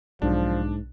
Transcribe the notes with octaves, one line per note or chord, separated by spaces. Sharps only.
B1 G#2 F3 D4